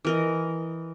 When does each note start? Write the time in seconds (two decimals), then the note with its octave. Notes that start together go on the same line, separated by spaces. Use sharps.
0.05 E3 A#4 D#5